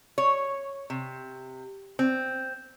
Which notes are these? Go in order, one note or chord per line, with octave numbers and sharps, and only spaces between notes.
C#5
C3
C4